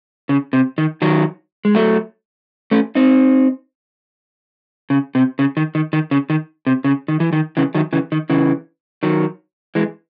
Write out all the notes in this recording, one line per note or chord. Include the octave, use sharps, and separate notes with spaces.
C#3
C3
D#3
D#3 F#3
G#3
F#3 A3
A3 C#4
C4 D#4
C#3
C3
C#3
D#3
D#3
D#3
C#3
D#3
C3
C#3
D#3
E3
D#3
C#3 E3
D#3 F#3
C#3 E3
D#3
C#3 E3
D#3 F#3
E3 G#3